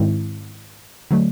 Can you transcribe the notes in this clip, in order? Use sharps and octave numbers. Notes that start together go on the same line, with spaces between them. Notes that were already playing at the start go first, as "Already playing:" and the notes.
Already playing: G#2 D#3 G#3 C4 E4
D3 F#3 A3